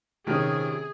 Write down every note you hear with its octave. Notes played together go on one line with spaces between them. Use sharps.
A#1 C3 D#3 C#4 G#4